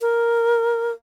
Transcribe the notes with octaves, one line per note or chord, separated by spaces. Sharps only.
A#4